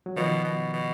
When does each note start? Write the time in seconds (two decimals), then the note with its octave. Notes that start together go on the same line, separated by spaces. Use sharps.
0.06 F#3
0.16 B2 D#3 F3
0.44 B2
0.73 B2